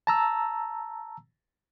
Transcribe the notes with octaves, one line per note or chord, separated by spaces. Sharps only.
A5 A#5 E6